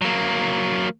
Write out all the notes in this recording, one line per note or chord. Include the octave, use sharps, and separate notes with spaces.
F#3 A#3